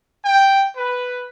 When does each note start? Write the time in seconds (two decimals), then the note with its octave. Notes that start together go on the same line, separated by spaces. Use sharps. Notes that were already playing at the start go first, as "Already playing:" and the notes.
0.24 G5
0.76 B4